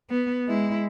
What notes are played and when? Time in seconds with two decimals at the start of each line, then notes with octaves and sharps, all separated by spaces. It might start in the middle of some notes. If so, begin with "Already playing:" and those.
0.10 B3
0.48 G#3 E4